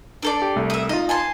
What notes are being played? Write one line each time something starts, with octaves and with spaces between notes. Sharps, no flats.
D4 A4 D5
G4
C2 A3
E5 D#6
D#4 F4 D#5
G#5 A5 C6